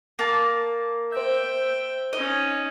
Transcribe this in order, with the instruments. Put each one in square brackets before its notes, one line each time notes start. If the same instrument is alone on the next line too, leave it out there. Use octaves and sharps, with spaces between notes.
[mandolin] A#3 A5
[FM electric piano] C5 G6 [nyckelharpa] E5 G5
[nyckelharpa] C#4 D#4 [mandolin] D#5